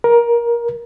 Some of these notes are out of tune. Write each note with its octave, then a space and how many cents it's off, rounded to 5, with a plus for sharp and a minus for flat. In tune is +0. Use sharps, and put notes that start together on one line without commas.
A#4 +20